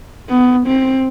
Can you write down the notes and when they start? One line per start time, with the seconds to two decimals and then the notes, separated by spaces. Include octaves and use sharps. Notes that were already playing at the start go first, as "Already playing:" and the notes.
0.29 B3
0.67 C4